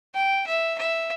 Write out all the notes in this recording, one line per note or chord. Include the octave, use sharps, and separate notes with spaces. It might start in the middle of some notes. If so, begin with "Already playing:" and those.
G5
E5
E5